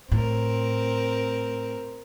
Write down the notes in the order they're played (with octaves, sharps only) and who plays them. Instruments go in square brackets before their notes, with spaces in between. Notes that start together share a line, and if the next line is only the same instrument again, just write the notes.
[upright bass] A2 [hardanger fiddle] C4 A#4